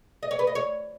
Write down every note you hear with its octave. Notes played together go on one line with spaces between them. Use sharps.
D#5
C#5
B4
D#5
C#5